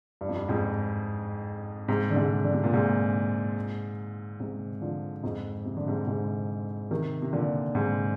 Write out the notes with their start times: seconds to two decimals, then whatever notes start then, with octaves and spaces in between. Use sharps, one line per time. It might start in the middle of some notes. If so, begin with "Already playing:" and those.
0.21 G2
0.29 F2
0.36 G2
0.48 F2 G#2
1.88 G#2 C3
2.11 D3
2.16 G#2 C3
2.44 D3
2.54 C3
2.64 A#2
2.73 G#2 C3
4.40 G#2 C3
4.81 D3 F3
5.23 F2 G#2
5.65 C3
5.77 D3
5.87 G#2 C3
6.07 G#2 C3
6.91 C3 D#3
7.22 C3
7.33 A#2 D3
7.75 G#2 C3